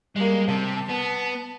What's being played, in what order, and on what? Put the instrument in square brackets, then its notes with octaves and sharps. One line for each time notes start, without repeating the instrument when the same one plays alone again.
[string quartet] G3 A#3 [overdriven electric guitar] G#3
[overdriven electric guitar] C3 [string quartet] A5
[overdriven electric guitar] B3